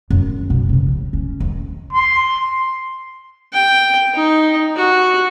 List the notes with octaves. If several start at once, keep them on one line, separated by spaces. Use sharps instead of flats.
F#2
B2
C#3 F3
C#3
C#4
D#2
C6
G5
D#4
F#4